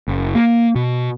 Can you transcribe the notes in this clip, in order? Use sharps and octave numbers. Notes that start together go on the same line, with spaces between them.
F#1
A#3
B2